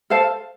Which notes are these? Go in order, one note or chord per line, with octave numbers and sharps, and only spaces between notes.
A4 C5 F5 A5